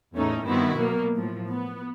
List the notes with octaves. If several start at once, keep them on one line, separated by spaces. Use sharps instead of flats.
E2 A2 A3 C#4 D#4
G2 D#3 B3 C4 E4 F#4
B2 F#3 A#3 B3
A2 F3
B3